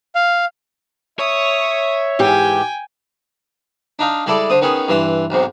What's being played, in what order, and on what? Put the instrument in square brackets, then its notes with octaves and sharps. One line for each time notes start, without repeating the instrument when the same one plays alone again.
[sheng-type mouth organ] F5
[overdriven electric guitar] C#5 [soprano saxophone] E5 [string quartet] D#6
[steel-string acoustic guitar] G#2 E3 G4 [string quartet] G5 G#5
[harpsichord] D4 D#4 F5
G3 G#3 E4 A4 D5
D3 C5 D#6
D#3 B3 C#4 G#4
G2 E3 E5 C6
B1 G#2 C3